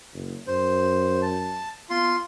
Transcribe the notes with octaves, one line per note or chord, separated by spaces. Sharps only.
F#1
F#2 C5
A5
B3 F4 C6